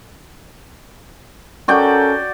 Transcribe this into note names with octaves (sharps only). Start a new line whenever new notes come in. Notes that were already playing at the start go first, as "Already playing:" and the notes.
C#4 F#4 A4 A#4 D5 G5